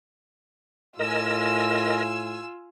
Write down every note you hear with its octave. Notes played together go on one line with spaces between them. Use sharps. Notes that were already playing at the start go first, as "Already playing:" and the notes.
A2 F4 A#4 D#5 G#5 E6